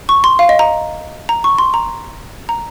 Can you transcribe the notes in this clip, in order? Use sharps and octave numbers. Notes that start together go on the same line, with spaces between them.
C#6
C6
F5
D#5
A#5
A#5
C#6
C6
A#5
A#5